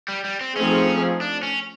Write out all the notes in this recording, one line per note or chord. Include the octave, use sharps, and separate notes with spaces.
G3
G3
C4
F3 A3 C4 C#4 D#4 G#4
D4
C#4